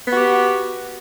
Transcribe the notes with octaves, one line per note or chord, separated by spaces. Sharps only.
B3 F#4 G4